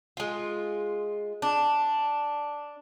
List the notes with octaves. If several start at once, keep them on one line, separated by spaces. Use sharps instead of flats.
G#3 F4
D4